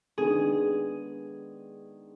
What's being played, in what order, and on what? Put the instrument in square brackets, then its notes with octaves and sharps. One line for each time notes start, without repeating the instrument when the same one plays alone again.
[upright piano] D#3 G#3 B3 D4 [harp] G#4